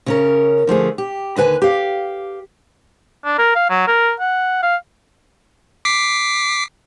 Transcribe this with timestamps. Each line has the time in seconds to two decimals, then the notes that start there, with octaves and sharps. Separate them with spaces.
0.06 C#3 C#4 A#4
0.67 D3 F3 A3 G#4
0.98 G4
1.36 D#2 D3 B4 G#5
1.62 G4 F5
3.25 D4
3.39 A#4
3.55 F5
3.70 F#3
3.88 A#4
4.20 F#5
4.63 F5
5.85 D6 B6 C7